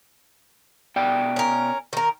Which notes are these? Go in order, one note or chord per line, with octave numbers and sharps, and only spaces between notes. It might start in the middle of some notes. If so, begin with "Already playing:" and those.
B2 D5 G5
C#4 A#4
D#3 A#4